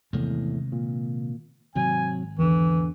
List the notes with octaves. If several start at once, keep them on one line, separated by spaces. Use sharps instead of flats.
E2 A2 C3 D#3 G#3
A#2
G#1 C3 F#3 G#5
E2 D3 E3